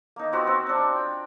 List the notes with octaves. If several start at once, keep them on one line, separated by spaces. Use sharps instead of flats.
A#3 D#4
C4 F4 F#4 B4
C4
C4 D4
G5